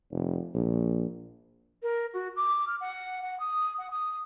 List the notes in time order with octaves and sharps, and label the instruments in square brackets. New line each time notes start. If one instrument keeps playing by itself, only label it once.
[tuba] F1
A#1
[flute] A#4
F#4
D6
F6
F#5
F#5
D#6
F#5
D#6